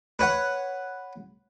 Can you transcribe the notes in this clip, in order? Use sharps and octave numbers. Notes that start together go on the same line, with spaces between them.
B4 C#5 F#5